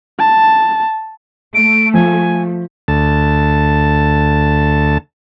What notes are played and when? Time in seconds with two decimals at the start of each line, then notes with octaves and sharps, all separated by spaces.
0.19 A5
1.55 A3 D7
1.94 F3 G#5
2.88 D2 A5